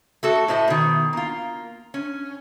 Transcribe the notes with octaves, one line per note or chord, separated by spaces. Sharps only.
A3 F#4 A4 A5
A2 C5 D#5 E5 A5
B2 D#3
A#3 F4
C#4